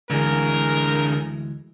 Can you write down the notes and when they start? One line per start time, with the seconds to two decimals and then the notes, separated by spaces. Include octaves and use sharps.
0.10 D2 D3 E3 G#3 G#4 A#4